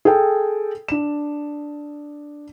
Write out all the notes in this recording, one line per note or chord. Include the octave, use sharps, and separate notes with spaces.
G#4 A4 G5
D4 E7